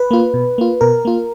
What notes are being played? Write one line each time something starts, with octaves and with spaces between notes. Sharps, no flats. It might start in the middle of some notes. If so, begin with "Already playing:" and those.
Already playing: B4
A#3 F4
B2
A#3 F4
B2 A#4
A#3 F4